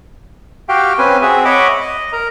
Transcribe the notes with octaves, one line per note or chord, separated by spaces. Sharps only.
F#4 G4 F5 G5
C4 C#4 B4 G#5
C4 F#4 G#4 E5
C#5 D#5 E5 F#5 B5 D6
D#5
A#4 A#5